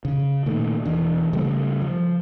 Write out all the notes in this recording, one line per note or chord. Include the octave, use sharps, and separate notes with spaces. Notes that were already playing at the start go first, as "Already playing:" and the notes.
C#3
A#2 D#3 A3
E1 E3 D4
C#3 G3 A3
F3